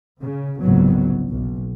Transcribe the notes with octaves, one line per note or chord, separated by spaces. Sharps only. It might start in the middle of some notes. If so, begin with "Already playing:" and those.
C#3
F#1 C2 F2 G#2 F#3 B3
B1